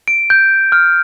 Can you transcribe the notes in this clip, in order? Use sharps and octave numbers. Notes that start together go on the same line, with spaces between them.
D7
G6
F6